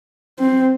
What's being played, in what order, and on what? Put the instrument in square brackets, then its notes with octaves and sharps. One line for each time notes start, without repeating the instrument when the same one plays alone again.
[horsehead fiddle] C4